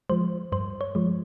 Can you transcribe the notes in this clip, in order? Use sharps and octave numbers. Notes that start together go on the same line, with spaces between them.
F3 G#3 C5
G2 C5
C#5
F3 G#3